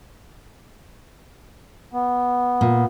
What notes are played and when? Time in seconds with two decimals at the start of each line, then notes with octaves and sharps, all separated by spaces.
1.93 B3
2.61 A#2